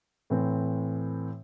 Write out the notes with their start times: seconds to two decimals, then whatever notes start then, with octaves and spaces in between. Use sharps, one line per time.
0.30 A2 E3 C4